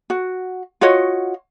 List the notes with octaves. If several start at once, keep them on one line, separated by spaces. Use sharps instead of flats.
F#4
F4 F#4 C#5 D#5